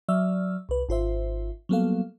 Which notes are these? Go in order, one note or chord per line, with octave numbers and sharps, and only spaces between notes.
F#3 D5 E5 E6 F6
C2 B4
G#1 F4 C5 E5
F#3 G3 A#3 B3 A4 F5